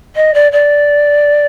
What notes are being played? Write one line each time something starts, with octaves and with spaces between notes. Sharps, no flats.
D#5
D5
D5